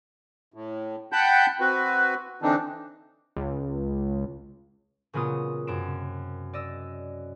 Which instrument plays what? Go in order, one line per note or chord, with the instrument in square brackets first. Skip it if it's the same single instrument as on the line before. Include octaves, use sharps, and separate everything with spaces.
[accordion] A2
F#5 G5 A5 B5 G6
C4 F#4 B4
D3 E3 C4 D4 D#4
[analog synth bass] C#2
[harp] A#2 C#3 F#3 B3 F4 D#6
F#2 C3 D7 E7
D5 D#5 E6